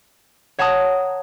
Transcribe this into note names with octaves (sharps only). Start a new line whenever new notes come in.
C#5 F#5 A5 A#5 D#6